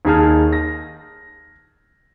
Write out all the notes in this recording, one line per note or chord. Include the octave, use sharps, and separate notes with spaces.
D#2 D#4 G#4 A5 F6
A#6